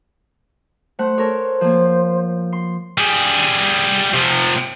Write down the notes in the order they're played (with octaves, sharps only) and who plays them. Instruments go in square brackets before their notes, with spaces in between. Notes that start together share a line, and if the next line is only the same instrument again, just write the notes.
[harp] A3 F#5 [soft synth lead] C5
[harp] A4 A#4 C#5
F3 A#3
C6
[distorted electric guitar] G3 G#4
C3 F3